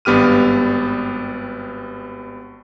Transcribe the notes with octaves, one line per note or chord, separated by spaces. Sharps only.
G#1 G2 B3 G4 F6 D#7